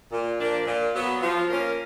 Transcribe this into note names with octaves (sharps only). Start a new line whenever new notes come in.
A#2
F3 A#3 D4
A#2
F#3 B3
F3
A#3 C#4 F4 A#4